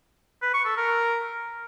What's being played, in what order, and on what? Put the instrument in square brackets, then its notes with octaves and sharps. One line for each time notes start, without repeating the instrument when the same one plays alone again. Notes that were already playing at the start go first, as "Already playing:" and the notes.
[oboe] B4
C#6
A4
A#4